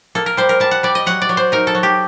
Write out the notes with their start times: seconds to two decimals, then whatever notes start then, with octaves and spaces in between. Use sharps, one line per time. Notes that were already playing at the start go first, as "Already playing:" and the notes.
0.15 A#3 A4
0.26 A#4
0.37 G3 C5
0.49 A#4
0.60 G3 A5
0.71 F#5
0.83 G3 D5
0.95 D#5
1.06 F#3 F#5
1.22 D5
1.29 F#3
1.37 C5
1.52 D#4 A#4
1.67 A4
1.75 F#3
1.83 G4